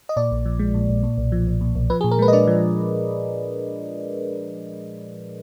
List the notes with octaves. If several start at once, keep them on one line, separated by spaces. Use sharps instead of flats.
D#5
A#2 D5
A#1
F3
G#3
A#2
A#1
A#2
B1
F3
B1
A#2
B1
F3 B4
G#4
A#2
A#4
G#3 B4
D#5
D4 D5
F3